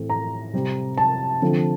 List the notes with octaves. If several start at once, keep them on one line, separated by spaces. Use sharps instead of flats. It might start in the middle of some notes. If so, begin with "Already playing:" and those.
Already playing: A2 E3 A3 C4
A#5
C3 G3 C4
A5
D3 F3 A3 C4